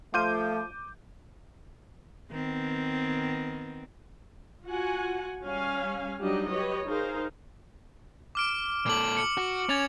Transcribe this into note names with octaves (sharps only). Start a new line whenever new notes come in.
F3 A3 F4 D6 G6 D#7
D#3 B3 C4
F4 F#4 F#5 G#5
G3 C#4 F5 G#5
F#3 G3 D4 D#4 G4 D#5
G4 B4 C#5 D#5
D#4 G#4 A#4 C5 F5
D6 F6 D7
A#2 A4 D6 F#7
C#7
F#4
C#4 G#6 A6 F7